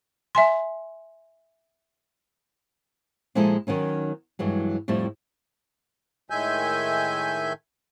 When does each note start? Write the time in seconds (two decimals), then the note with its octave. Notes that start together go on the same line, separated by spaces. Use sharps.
0.35 E5 G#5 C6
3.35 A#2 F3 G#3 D#4 E4 A4
3.67 D#3 F#3 C#4 D#4
4.39 G2 E3 F#3 G#3
4.88 F2 A2 G3 E4 C5
6.30 A2 D#3 G#3 E5 G#5 G6